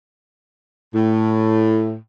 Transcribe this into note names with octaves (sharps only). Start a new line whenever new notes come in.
A2